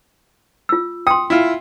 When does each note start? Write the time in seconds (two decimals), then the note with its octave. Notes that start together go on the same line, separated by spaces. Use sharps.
0.69 F4 E6
1.07 G5 C6 D#6
1.30 E4 F4